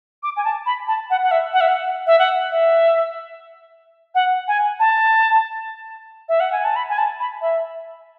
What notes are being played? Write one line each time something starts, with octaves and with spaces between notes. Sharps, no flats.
D6
G#5
A5
B5
A5
F#5
F#5
E5
F#5
E5
F#5
E5
F#5
E5
F#5
G#5
A5
E5
F#5
G#5
A5
B5
G#5
A5
B5
E5